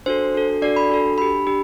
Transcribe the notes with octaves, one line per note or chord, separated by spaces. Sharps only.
D4 F#4 A4 C5
D4 F#4 A4
D4 F#4 A4 D5
B5
D4 F#4 A4
D4 G4 B5
D4 G4